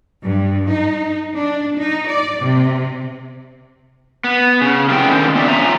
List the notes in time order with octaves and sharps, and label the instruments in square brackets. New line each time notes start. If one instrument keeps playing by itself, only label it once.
[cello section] G2
D#4
D4
D#4
D5
C3
[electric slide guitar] B3
C#3
C3 E3 G#3 B3 E4 G5
D3 D#3 C#4 C5
B3 C4 D4 D#4 D5 E5
C#3 F3 G#4 E5 G#5 A#5